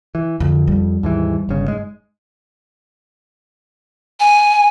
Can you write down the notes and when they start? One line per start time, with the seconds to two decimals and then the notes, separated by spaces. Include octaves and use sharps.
0.15 E3
0.40 F2 D3
0.68 G3
1.03 D#2 G#2 E3
1.49 G1 C#3
1.68 G#2 G#3
4.20 G#5